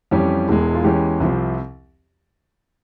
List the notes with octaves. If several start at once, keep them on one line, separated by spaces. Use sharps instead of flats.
F2 E3 G3 C#4 G4
E1 E2 E3 G#3
F4
E2 E3 G#3 C#4 G4
C2 C3 F3 C4